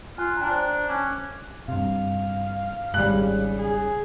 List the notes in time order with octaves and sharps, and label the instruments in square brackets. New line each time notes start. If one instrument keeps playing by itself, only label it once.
[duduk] F4 [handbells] G#5 C6 F#6
[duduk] D4 [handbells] G5 A#5
[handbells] C5
[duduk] C#4 [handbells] D6 F#6 G#6
[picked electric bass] G2 C3 [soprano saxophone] F5
[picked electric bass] G#1 G#2 [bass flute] C#3 [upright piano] G3 F#6
[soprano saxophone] G#4